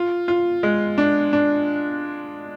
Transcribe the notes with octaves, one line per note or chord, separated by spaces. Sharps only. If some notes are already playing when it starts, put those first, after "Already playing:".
Already playing: F4
F4
G#3
D4
D4